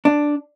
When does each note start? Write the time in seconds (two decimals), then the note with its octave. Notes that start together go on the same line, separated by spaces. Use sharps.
0.05 D4